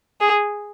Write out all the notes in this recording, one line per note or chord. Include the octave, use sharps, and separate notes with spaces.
G#4